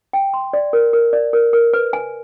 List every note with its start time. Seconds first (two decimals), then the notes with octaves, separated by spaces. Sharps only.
0.13 G5
0.34 C6
0.53 D5
0.73 A#4
0.93 A#4
1.13 D5
1.33 A#4
1.53 A#4
1.73 B4
1.93 G#5